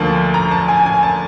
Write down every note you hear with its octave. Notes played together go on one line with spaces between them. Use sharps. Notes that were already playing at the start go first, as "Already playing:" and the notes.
Already playing: D2 D3 F3 A#3 A5
A#5
A5
G#5
G#5
A5